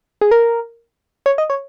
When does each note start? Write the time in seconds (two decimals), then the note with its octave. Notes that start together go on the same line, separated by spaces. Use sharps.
0.21 G#4
0.31 A#4
1.26 C#5
1.38 D#5
1.50 C#5